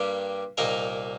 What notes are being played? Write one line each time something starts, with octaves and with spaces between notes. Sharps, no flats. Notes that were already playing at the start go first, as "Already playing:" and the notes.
Already playing: G2 G3 A#3 G4
C2 A#2 A#3 D#4 A#4